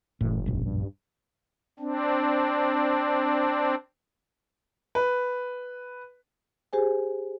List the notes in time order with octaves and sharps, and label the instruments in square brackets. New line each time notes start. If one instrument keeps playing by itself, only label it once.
[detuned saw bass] F#1 [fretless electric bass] A2 E3
[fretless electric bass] E1 A#1 F#2
[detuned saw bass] G2
[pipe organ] C4 D4
[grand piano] B4
[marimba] G4 G#4 C5 G#5